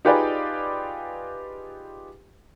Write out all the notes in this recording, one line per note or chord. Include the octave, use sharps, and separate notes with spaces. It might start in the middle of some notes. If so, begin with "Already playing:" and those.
D#4 F4 G4 G#4 B4 D5